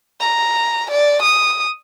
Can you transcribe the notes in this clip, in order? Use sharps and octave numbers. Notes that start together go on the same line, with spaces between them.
A#5
D5
D#6